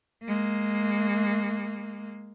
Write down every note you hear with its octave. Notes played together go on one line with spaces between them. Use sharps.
G#3 A#3